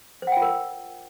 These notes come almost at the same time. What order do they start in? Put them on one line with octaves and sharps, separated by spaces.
C5 F#5 G5 F4 A#4